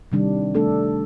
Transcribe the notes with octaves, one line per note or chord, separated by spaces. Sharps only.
C3 D#3 G3 D4
A3 D4 A4